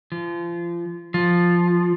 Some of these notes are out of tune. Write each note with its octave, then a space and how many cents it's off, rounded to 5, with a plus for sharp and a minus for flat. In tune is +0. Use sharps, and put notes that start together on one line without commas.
F3 -30
F3 +5